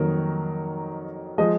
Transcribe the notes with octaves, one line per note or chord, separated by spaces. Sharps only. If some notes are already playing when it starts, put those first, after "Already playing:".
Already playing: F2 D#3 F#3 A#3 A#4
F3 G#3 D#5